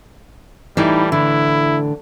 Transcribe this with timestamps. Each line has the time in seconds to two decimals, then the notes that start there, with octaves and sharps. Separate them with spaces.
0.77 A2 E3 G3 D#4
1.12 D3 E4